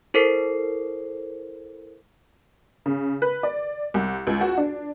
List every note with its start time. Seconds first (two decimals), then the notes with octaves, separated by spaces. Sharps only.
0.14 E4 A4 A#4 C5 C7
2.86 C#3
3.22 B4
3.43 D5
3.94 C2
4.27 C#2
4.41 F#4
4.58 D4